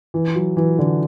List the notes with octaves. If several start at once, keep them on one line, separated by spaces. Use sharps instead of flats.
E3
F#3
E3
D3